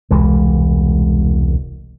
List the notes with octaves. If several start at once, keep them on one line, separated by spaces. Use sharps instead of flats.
E1 C2 E3 G#3